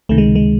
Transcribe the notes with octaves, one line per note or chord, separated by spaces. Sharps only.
C#2 C3 D#3 A3
G#3
G#3